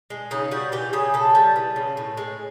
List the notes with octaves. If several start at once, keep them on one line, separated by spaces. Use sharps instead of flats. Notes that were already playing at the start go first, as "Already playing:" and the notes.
G#3
C#3 D#4
G3 F#4
E3 G4
C#3 G#4
C#3 A4
G3
E3
C#3
A2
G#3